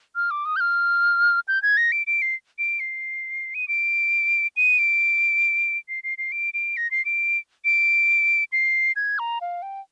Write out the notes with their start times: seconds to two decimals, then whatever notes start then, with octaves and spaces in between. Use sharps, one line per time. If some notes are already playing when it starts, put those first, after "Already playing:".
0.16 F6
0.31 D6
0.45 D#6
0.56 G6
0.60 F6
1.48 G6
1.63 G#6
1.77 A#6
1.92 D7
2.07 D7
2.22 C7
2.59 D7
2.80 C7
3.55 D#7
3.68 D7
4.57 D#7
4.79 D7
5.89 C7
6.04 C7
6.18 C7
6.32 D7
6.54 D7
6.77 A#6
6.91 C7
7.05 D7
7.65 D7
8.52 C7
8.96 G#6
9.19 A#5
9.41 F5
9.62 G5